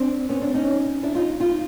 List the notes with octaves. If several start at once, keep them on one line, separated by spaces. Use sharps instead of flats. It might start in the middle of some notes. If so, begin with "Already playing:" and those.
Already playing: C4 D4
B3 C#4
C4 D4
C#4 D#4
D4 E4
D#4 F4
D#4 F4